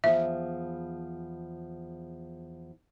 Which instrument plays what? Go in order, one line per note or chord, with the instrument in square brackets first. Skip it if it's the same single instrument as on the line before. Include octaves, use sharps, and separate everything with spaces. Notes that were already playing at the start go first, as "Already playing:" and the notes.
[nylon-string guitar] E2 F3 [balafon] E5